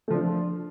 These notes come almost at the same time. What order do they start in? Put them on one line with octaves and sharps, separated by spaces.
A3 F3 D4